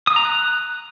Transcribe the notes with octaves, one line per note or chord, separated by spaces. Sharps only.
D#6
A#5
F#6